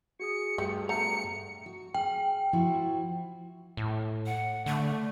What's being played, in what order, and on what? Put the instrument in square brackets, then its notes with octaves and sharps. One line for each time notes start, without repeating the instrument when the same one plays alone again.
[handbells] F#4 G#4 D#6 [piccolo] C#7
[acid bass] G2 [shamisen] A3 G4
[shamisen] A3 B3 A#5 [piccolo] C#7
[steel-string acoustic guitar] F#4
[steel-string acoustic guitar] G#4 [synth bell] G5
[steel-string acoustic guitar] F3 E4 F#4
[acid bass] A2
[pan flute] F#5
[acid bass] D3 [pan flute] A3